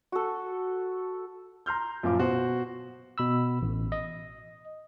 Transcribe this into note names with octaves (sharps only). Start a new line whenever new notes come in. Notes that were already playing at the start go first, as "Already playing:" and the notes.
F#4 A4
A#5 C6 F6 G6
F#2 A#2 F3 F5 D6
B2 F#4 C5
B2 B5 E6
A1
D#5